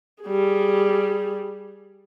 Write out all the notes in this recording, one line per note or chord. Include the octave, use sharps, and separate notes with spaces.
G3 G#4